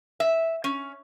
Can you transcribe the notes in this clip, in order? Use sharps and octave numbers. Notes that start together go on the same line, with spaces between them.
E5
C#4